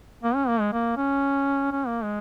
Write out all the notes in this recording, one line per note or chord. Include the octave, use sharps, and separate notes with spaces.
A#3
C#4
A#3
G#3
A#3
C#4
C#4
A#3
G#3